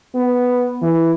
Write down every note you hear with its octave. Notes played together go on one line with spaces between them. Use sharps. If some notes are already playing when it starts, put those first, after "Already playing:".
B3
E3